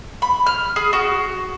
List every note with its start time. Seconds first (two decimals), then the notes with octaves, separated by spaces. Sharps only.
0.22 B5
0.46 F6
0.76 G#4
0.93 F#4